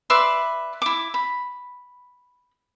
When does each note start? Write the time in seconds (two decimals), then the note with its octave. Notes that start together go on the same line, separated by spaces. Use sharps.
0.10 B4 D5 E5 C6
0.82 E4 D6
1.14 B5